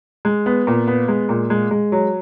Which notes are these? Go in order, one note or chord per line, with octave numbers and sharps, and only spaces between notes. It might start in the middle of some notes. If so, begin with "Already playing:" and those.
G#3
B3
A#2
B3
G#3
A#2
G#3
G#3
F#3